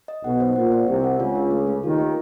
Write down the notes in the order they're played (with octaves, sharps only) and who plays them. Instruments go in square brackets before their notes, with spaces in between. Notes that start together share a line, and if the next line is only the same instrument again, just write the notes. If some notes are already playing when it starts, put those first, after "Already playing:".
[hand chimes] D#5
[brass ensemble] B1 B2 [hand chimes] F#5
[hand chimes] C5
[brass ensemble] A#2 [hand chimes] F#5
[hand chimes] C5
[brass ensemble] C2 C3 [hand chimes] G4
[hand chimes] F#5
[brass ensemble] C#2 C#3 [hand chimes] F4
[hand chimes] D4
A3
A3
[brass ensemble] D#2 D#3 [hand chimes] F4
[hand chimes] A3